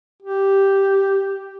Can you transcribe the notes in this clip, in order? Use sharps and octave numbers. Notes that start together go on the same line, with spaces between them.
G4